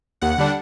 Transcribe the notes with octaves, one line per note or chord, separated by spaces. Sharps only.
D#2 F#5
D3 G3 D4